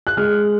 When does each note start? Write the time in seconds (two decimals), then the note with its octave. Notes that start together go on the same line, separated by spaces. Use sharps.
0.07 F#6
0.17 G#3 F6